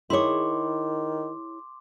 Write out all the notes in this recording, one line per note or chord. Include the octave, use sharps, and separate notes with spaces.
D#3 E4 G#4 C#5 C6 D6